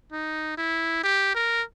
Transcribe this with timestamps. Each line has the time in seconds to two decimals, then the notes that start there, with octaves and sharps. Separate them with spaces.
0.12 D#4
0.58 E4
1.04 G4
1.35 A#4